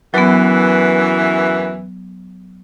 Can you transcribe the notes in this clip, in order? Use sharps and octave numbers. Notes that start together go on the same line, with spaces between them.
F#2 E3 F#3 B3